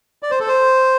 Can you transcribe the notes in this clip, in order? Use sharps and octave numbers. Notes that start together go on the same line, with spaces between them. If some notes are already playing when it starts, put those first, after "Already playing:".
D5
C5
A4
C5